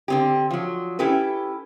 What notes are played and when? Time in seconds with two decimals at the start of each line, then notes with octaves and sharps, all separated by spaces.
0.08 D3 C4 G4
0.51 F3 F#3
0.99 C#4 E4 G4 A4 B4